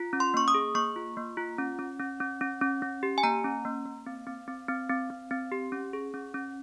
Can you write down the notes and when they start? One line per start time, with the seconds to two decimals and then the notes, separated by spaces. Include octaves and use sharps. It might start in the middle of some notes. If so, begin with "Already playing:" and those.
Already playing: F4
0.13 C#4
0.20 C6
0.34 A#3 C#6
0.48 D#6
0.54 G#4
0.75 A#3 C#6
0.96 F4
1.17 A#3
1.37 F4
1.58 C#4
1.79 C#4
2.00 C#4
2.20 C#4
2.41 C#4
2.61 C#4
2.82 C#4
3.03 G4
3.18 G#5
3.23 A#3 A#5
3.44 C#4
3.65 A#3
3.86 A#3
4.06 C4
4.27 C4
4.48 C4
4.68 C4
4.89 C4
5.10 C4
5.31 C4
5.52 G4
5.72 C#4
5.93 G#4
6.14 C#4
6.34 C#4